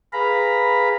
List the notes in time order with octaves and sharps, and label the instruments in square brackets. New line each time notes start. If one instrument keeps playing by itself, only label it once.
[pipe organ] G#4 B4 F5 A#5 B5